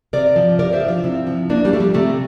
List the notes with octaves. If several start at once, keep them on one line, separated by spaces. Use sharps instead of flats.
C3 A#4 D5
F3
C3 A#4 D5
C5 E5
F3
D4 F4
C3 C4 E4
F3
C3 A#3 D4
G3 A#3
F3 A3
G3
C3 A3